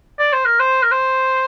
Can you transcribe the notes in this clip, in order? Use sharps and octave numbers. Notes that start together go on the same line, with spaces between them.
D5
C5
A#4
C5
A#4
C5